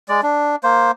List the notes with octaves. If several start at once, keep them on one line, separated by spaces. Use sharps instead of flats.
G#3 D5
D4
A#3 C5